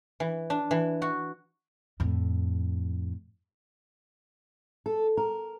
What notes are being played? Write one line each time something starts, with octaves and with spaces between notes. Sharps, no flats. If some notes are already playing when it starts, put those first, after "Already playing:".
E3
D4
E3
F#4
F2 A2
A4
A#4